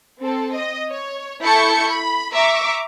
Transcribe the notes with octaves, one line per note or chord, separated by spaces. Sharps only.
C4 A4
D#5
C#5
E4 A4 A5 C#6 G6 C#7
B5
E5 A#5 C#6 D6